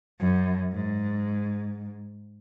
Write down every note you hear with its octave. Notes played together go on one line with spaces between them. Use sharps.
F#2
G#2